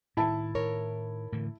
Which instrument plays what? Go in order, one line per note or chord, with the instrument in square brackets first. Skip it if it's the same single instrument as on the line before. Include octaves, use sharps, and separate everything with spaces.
[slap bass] A2 D#3 [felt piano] E4 A5
[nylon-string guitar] A#4 C#5
[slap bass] A2 D3 E3